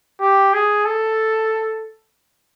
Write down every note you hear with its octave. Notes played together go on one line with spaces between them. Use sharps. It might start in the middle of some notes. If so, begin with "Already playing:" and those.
G4
G#4
A4